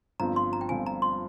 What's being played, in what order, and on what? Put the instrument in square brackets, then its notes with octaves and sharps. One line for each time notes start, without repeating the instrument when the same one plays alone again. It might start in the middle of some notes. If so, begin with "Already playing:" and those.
[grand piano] G1 G2 F3 C4 F4 [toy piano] A#5
[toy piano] C6
A#5
G5
[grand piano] G1 G2 F3 C4 F4 [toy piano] G#5
[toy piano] A#5
C6